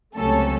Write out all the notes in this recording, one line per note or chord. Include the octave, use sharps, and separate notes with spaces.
C#2 C3 F#3 A3 C#4 A4